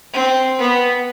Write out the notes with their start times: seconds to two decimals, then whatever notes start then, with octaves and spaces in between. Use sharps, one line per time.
0.13 C4
0.59 B3